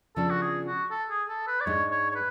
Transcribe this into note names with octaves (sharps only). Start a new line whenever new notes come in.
C#3 F3 B3 D4 A4
F#4
G#4
F#4
A4
G#4
A4
B4
D5
G#2 G#3 D4 C#5
C#5
C#5
B4